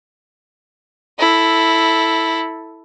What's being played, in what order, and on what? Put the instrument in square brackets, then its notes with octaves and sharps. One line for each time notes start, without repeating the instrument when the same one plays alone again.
[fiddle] E4 A4